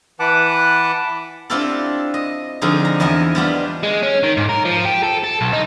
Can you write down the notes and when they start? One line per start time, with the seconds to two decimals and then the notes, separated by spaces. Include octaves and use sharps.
0.20 E3 B4 F#5 A5 D6
1.50 C4 D4 E4 F4 G4 A4
2.14 D#5
2.62 D3 F3 C4 D#4 G#4
2.85 A#5
3.00 E2 E4 D#5 G#5
3.35 G3 B3 D4 F4
3.83 G#3
4.03 C#4
4.23 D#3
4.37 G#2
4.49 A#4
4.65 F3
4.85 G4
5.03 A4
5.24 A4
5.41 B1
5.53 D#4